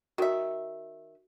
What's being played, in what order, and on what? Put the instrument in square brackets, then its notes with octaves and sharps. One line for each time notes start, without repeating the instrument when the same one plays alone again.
[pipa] D#3 E5 [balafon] F#4